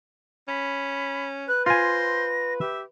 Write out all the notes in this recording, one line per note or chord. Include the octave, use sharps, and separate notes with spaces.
C#4 B5
B4 F#6
F4 C5 G#5 A#6
G4 E5